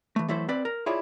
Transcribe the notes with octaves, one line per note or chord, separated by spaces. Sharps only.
E3 A3
E3 F#3 A3 E4 A4 C5
C4 B4 D5
A#4
E4 F4 G#4 C#5 D5